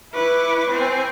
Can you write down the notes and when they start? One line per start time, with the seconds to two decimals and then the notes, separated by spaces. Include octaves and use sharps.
0.13 E4 B4 C#6 D6
0.70 C4 G#5